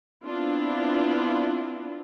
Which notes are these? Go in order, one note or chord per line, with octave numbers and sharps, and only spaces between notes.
B3 C4 D4 E4 F4